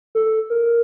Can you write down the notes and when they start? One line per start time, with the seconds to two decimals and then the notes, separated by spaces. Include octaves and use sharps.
0.15 A4
0.50 A#4